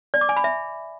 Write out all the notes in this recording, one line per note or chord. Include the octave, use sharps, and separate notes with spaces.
D5
D6
G#5
B5
E5